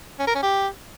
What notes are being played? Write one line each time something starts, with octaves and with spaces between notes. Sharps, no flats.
C#4
A#4
C#4
G4